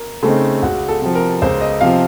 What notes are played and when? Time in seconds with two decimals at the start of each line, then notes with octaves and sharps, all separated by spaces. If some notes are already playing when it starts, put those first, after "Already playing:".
Already playing: A#4
0.23 C#3 A3 C4 D#4 A4
0.63 C#2 F#4
0.88 A4
1.02 C3 F3
1.15 A#4
1.42 C#2 C5
1.61 D#5
1.81 C3 F3 F5